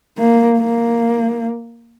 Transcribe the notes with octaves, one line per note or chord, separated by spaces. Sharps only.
A#3
A#3